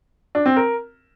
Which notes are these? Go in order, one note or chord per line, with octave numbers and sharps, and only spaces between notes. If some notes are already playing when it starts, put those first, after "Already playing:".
D4
C4
A#4